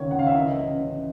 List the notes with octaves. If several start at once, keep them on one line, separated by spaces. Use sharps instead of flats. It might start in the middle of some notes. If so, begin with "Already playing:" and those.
Already playing: C#2 D#3 C#5
C#2 F#5
F5
E5
E3 D#5
A1
A1